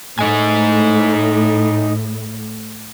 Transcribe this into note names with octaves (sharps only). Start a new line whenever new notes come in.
A2 D#4 D#5 G#5